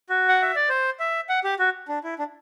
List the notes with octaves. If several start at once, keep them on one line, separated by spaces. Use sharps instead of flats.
F#4
F#5
E5
D5
C5
E5
F#5
G4
F#4
D4
E4
D4